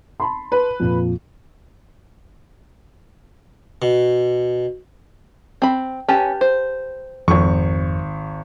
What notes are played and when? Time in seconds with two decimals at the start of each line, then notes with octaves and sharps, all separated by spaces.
0.20 A5 B5 C6
0.52 B4
0.80 F2 A#2
3.82 B2
5.62 C4 B5
6.09 C#4 G4 B4 A5
6.41 C5
7.28 G#1 F2 C#6